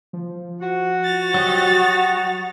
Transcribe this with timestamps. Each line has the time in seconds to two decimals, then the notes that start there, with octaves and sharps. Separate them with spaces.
0.13 F3
0.61 F#4
1.03 A6 F7
1.34 F#3 G4 D#5